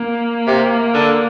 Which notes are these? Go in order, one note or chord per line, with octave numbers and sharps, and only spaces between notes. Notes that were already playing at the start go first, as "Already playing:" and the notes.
Already playing: A#3
C3
D3